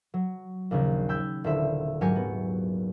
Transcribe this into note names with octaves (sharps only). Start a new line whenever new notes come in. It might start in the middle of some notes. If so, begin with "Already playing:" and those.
F#3
A#1 D#2 C#3 A#4
G5 B5 E6 G6 G#6
D#1 D3 E4 C5 E5 E6
G#2 F#3 G4 A#4 G#5 C#7
B3